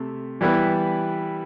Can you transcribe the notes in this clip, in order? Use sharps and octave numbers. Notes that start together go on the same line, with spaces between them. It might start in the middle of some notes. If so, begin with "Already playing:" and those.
Already playing: C3 A3
E3 G3 B3 E4 B4